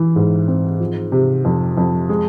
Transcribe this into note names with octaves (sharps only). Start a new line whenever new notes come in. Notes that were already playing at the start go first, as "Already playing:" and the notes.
Already playing: E3
G#2
C4
F3
C3
F2
F2
G#3